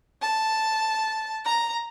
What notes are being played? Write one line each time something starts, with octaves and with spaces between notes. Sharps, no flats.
A5
A#5